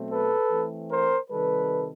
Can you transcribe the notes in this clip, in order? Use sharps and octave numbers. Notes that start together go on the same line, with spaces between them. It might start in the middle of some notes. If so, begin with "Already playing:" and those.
Already playing: B2 F#3 A3 C4
A4 B4
E3 A3 C4
A#4 C5
C3 D#3 G3 A4 B4